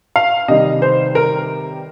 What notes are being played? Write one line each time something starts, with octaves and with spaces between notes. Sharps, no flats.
F5
C3 D#3 G3 D#5
C5
A#4